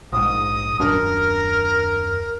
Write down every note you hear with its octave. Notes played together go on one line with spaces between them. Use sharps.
A#1 G#2 D#6
D#1 F#2 D4 A#4